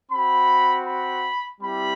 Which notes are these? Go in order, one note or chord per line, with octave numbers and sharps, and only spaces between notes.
C4 F#4 B5
B5
G3 C4 E4 G4 B5